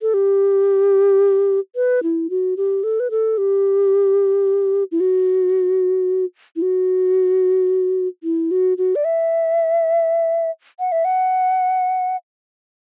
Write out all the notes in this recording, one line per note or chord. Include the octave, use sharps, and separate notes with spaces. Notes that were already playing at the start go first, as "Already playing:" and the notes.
A4
G4
B4
E4
F#4
G4
A4
B4
A4
G4
E4
F#4
E4
F#4
E4
F#4
F#4
D5
E5
F#5
E5
F#5